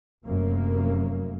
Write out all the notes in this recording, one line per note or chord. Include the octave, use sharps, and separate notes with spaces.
F1 F#2 A#3